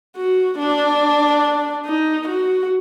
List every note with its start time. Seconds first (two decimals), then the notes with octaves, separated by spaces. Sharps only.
0.17 F#4
0.59 D4
1.85 D#4
2.28 F#4